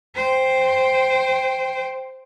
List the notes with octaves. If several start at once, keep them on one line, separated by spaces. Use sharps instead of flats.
C5 G5